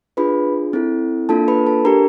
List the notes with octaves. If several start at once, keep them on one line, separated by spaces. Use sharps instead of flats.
D4 F4 G#4 B4 B5
C4 E4 A4
A#3 D4 F4 A4 A5
B4 B5
A4 A5
D4 G4 A#4 A#5